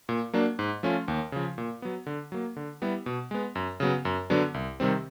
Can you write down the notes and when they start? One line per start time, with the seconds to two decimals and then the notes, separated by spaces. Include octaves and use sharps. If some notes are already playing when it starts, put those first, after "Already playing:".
0.09 A#2
0.34 F#3 A#3 D4
0.59 G#2
0.83 F3 A3 C#4 F4
1.08 D#2
1.32 C#3 F3
1.58 A#2
1.82 F#3 B3
2.06 D3
2.32 F#3 A#3
2.56 D3
2.82 G3 B3 E4
3.06 B2
3.31 G#3 B3
3.55 F#2
3.80 C#3 F#3 B3
4.05 F#2
4.30 D3 F#3 B3 D4
4.54 C2
4.80 C3 D#3 G3 C4